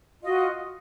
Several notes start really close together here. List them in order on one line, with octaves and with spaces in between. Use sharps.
F4 D#5 F#4